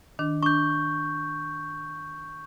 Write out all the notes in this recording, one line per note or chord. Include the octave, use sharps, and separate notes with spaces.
D#3 D4
D4 C#6 G6